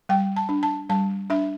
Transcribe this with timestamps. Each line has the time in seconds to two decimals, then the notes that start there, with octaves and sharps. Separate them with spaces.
0.09 G3 G5
0.36 A5
0.49 D4
0.63 A5
0.90 G3 A5
1.30 D4 E5